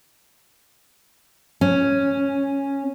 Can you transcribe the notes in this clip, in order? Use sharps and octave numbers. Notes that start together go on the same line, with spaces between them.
C#4